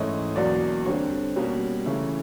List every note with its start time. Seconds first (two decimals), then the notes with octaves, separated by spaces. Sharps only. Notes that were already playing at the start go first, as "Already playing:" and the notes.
Already playing: G#2 E3 A3 C#4 D#5
0.35 E2 B2 F#3 A#3 C#4 D5
0.85 D3 G3 C4 C#5
1.36 B2 G3 A#3 C#4
1.85 C#3 E3 A3 C#4